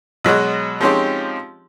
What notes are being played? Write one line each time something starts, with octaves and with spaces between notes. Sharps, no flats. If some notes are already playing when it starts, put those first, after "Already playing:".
B2 F#3 G#3 F#4
F3 G#3 C4 C#4 D#4 G4